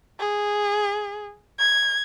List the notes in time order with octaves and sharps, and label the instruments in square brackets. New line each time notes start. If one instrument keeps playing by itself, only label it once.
[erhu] G#4
G#6